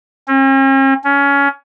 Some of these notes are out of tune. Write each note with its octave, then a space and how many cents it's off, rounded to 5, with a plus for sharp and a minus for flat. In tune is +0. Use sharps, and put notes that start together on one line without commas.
C#4 -45
C#4 +20